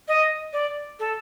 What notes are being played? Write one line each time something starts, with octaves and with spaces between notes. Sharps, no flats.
D#5
D5
A4